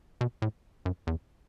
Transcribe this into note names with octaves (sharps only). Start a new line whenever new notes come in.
B2
A2
F#2
E2